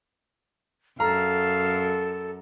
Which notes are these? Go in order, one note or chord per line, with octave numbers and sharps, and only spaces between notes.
F#2 A4 F5 A#5